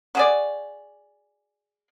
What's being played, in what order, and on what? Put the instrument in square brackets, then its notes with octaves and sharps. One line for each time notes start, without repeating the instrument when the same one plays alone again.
[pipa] F#4 G#4 D5